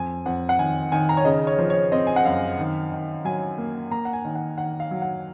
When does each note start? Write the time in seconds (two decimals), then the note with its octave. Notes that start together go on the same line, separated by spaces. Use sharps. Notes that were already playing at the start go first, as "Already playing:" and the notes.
Already playing: F2 G#5
0.26 F2 F#5
0.49 F#5
0.59 D#3 G#5
0.92 D#3 G#5
1.09 A#5
1.17 C#5
1.25 C#3 D#5
1.47 C#5
1.59 F3
1.70 C#5
1.92 C4 D#5
2.07 G#5
2.16 F#5
2.25 F#2 F5
2.58 D#3
2.92 D#3
3.25 F#3 G#5
3.58 A#3
3.91 A#3 A#5
4.05 F#5
4.13 G#5
4.25 D#3
4.35 F#5
4.58 D#3 F#5
4.80 F5
4.91 F#3
5.02 F#5